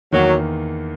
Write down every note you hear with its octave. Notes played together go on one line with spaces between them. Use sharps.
E2 D#3 F#3 A#3